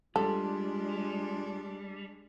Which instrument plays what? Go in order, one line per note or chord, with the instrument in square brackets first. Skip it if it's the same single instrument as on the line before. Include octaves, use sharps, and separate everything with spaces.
[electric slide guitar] G3 [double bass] G#3 D4 [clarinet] F4 [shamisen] A4